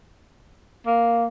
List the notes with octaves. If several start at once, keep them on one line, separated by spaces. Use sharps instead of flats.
A#3